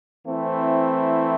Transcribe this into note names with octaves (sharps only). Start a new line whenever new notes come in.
E3 A3 C4 E4